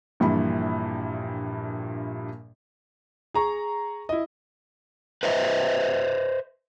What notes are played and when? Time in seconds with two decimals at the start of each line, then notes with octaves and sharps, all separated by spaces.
0.20 A#1 G2 A#2 E3 G3 B5
3.34 G#4 A#5 C#6
4.09 E4 D#5
5.23 B4 C5 D#5 E5